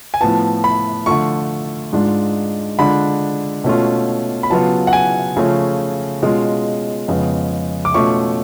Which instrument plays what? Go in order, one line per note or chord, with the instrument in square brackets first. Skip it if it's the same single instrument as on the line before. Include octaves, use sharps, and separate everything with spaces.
[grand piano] G#5
A2 F3 B3 A5
B5
D3 F3 A3 F4 C#6
G#2 G#3 D4 F4
D3 G#3 D4 F4 B5
B2 A3 C#4 F4
B5
C#3 F#3 B3 F4 A5
F#5
G#5
C#3 F3 A3 C#4 F4
B2 G#3 C#4 F4
F2 C#3 G#3 B3
D6
B2 A3 C#4 F4 C#6